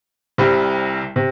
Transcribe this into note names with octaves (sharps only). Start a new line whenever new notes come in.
C2 C3 G3
C3